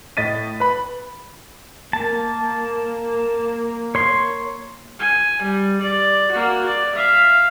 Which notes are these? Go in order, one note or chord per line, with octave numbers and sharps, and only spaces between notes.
A2 D#5 A6 B6 D#7
B4 B5
A#3 A5
C#5 C6
G#5
G3
D5
A#3 F#4
D5
E5 F5